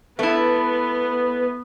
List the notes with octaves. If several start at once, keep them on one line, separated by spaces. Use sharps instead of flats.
A3 B3 E4 B4